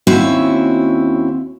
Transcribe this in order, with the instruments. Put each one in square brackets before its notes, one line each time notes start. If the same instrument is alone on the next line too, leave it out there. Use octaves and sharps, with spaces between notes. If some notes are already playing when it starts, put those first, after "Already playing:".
[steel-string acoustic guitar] D#2 C4 C#4 E4 F#4 E5